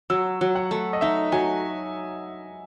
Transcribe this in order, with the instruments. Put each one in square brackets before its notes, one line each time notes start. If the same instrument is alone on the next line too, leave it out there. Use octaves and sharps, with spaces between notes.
[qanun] F#3 [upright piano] E6
[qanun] F#3
[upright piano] F#5
[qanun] A3
[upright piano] D#5
[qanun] D#4 [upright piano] E5
[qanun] F#3 [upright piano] G#5